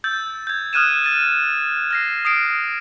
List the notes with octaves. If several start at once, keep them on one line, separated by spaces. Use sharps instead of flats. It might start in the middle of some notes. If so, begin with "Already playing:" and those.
E6 G6 A6
G6 G#6
D#6 F6 F#6 G#6 D#7 E7
A6 D#7
F6 A#6 C7
D#6 C7 D7